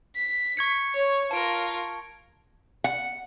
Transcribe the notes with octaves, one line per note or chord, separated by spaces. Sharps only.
B6
C#6 G#6 C#7
C#5
F4 A#4 A5 D7
F#5